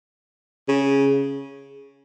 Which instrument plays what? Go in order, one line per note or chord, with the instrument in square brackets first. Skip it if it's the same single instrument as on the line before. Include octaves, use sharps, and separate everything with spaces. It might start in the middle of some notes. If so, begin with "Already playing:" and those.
[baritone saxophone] C#3